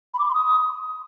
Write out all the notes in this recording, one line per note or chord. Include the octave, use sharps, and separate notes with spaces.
B5
D6
B5
C6
D#6